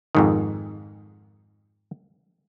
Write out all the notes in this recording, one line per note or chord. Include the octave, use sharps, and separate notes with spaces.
F2 G#2 D#3